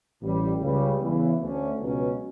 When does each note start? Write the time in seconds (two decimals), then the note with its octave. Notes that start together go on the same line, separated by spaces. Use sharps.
0.21 A1 A2 G3
0.60 C#2 C#3 G3
1.00 E2 C#3 E3
1.38 D2 D3 A3 C#4
1.78 C#2 B2 F#3 C#4